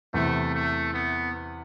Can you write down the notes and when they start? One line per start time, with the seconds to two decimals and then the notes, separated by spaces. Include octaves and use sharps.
0.14 E2 C3 E3 A3
0.55 A3
0.94 B3